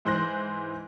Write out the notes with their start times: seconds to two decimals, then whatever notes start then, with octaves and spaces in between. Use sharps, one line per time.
0.05 G#2 E3 C5 C6 F#6 A#6